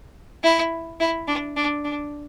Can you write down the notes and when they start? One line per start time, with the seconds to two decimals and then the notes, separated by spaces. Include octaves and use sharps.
0.43 E4
1.00 E4
1.28 D4
1.56 D4
1.84 D4